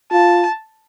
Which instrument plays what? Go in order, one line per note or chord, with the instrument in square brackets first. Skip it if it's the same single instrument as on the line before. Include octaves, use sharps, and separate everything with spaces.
[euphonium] F4 [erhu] A5